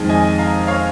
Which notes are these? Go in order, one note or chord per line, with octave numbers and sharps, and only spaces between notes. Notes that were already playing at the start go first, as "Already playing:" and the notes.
Already playing: F2 D#3 G#3
D#5 G#5
F5 A#5
C#5 F5